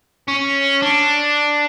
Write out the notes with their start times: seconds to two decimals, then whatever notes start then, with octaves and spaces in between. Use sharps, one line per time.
0.28 C#4
0.82 D4